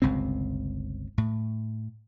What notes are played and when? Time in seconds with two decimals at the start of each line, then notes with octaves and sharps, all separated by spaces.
0.02 G1 C#2 C3 C4
1.18 A2